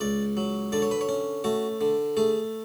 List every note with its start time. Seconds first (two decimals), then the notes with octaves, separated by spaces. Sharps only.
0.01 C#2 D5
0.37 F#3
0.72 D3 D5
0.82 C#5
0.91 B4
1.01 C#5
1.09 C#4
1.44 A3 F#4
1.81 D3
2.17 A3 G#4